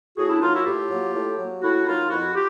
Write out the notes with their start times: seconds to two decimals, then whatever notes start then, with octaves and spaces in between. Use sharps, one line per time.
0.17 A2 F#4 G#4
0.29 D4 E4
0.41 F#3 A#3 D#4 F4
0.53 E4 F#4
0.65 A2 F4 G4
0.90 F#3 A#3
1.13 A2
1.38 F#3 A#3
1.62 A2 E4 F#4
1.85 F#3 A#3 D#4 F4
2.09 F2 E4 F#4
2.34 F4 G4